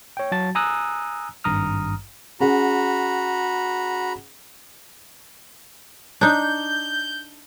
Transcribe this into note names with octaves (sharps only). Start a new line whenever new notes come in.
C#5 G5
F#3 F#4 A5 A6
G#5 A#5 D#6 E6 F#6
G#1 G2 A#5 D#6 F6
C#4 F#4 G#4 F#5 A#5 B5
D4 D#4 G6